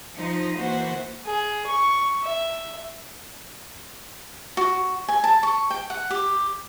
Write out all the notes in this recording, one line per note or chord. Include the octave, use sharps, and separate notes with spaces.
F3 D#4 A#6
E3 A#3 F#4 C5
G#4
C#6
E5
F#4
G#5
A5
C#6
G5
F#5
G4